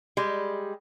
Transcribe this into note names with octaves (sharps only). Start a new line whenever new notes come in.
G3 G#3 G4